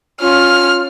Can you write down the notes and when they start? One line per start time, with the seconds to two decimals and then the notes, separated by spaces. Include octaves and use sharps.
0.21 C#4 F4 F6